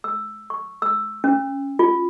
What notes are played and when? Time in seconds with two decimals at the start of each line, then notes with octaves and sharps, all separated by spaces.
0.04 E6
0.50 C#6
0.82 E6
1.24 C#4
1.79 F4